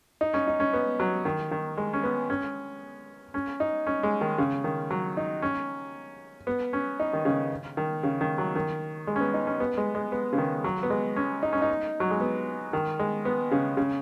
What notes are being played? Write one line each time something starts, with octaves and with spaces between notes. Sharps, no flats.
D#4
C#4
D#4
C#4
B3
F#3
D#3
D#3
G#3
C#4
B3
C#4
C#4
D#4
C#4
G#3
D#3
C#3
D#3
F#3
D#4
C#4
B3
C#4
D#4
D#3
C#3
D#3
C#3
D#3
F#3
D#3
G#3
C#4
B3
D#4
C#4
B3
G#3
G#3
B3
C#3
D#3
F#3
B3
G#3
C#4
D#4
C#4
D#4
F#3
G#3
B3
D#3
G#3
B3
C#3
C#3